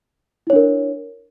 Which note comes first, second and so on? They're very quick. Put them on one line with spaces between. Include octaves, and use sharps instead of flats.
E4 C#5 D4 A#4